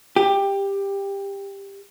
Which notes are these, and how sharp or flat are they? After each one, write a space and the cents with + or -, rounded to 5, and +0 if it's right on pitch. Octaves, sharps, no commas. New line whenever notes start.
G4 +15